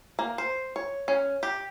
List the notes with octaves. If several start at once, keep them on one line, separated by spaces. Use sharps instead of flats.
A#3
C5
C#5
C#4
G4